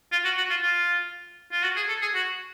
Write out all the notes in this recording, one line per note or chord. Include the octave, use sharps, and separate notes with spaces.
F4
F#4
F#4
F4
F4
F4
F#4
G#4
A4
G#4
F#4